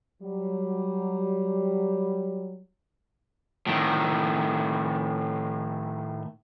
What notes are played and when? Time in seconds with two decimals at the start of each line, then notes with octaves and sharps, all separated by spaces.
0.22 F#3 G3
3.67 A2 D#3